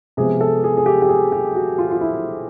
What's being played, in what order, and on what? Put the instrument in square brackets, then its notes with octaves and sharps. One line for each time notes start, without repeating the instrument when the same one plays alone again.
[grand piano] C3 F3 G#3 B3 G#4
A4
G#4
G#4
G4
G4
G#4
G4
F#4
F4
F4
E4